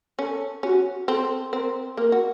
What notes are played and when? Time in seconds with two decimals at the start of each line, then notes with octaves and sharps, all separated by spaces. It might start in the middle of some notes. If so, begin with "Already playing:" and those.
0.19 C#4 A4
0.63 C#4 F#4
1.08 C4 A4
1.52 C4 A#4
1.97 A#3 A#4
2.12 F#4